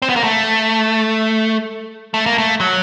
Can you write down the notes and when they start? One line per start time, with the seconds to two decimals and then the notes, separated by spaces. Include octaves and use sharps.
0.02 C4
0.10 B3
0.16 A#3
0.24 A3
2.14 A3
2.26 A#3
2.38 A3
2.60 F#3